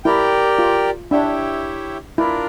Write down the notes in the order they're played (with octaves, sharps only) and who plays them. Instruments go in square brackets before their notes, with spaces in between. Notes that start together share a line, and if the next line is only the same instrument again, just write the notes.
[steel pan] E4 [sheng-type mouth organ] G4 A#4 D5 G5
[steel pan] F4
[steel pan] D4 [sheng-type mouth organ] E4 G4 C#5 E5 G5
[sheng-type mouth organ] D4 F4 A#4 D5 [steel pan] E4